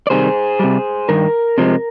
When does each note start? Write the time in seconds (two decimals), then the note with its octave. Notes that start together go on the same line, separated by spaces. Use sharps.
0.07 D5
0.10 C3 D#3 G3 G#4 C5
0.59 C3 G3
1.09 G2 D#3 A#4
1.58 C3 F3 G#3